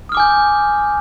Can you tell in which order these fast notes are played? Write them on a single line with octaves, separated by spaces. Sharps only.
D#6 F6 D6 G#5 G6